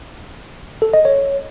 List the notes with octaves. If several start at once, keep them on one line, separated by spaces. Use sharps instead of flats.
A4
D#5
C#5